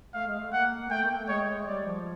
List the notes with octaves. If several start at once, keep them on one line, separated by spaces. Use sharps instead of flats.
A3 F5
G#3
A3
A#3 F#5
A3 G5
A#3
A3
G#3 C#5
G3 D5
F3